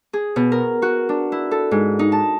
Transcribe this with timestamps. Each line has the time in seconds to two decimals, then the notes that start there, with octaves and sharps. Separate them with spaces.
0.13 G#4
0.36 B2
0.52 A#4
0.82 F#4
1.09 D4
1.32 E4
1.51 A4
1.71 G#2
1.99 D#4
2.12 A5